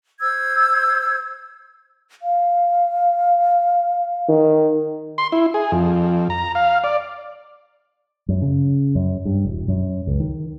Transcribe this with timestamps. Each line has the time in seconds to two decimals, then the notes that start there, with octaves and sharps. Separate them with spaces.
0.21 C5 E6 G#6
2.22 F5
4.29 D#3
5.18 C6
5.32 E4
5.54 G#4
5.72 F2
6.30 A#5
6.55 F5
6.84 D5
8.29 F#2
8.42 C#3
8.95 F#2
9.25 G2
9.45 E1
9.68 F#2
10.07 C#2
10.20 D#3